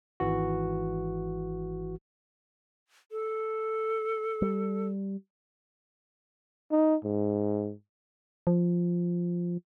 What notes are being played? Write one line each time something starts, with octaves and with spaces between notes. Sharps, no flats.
G#1 E3 F#4
A4
G3
D#4
G#2
F3